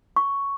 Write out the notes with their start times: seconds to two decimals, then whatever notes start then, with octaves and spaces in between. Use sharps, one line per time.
0.16 C#6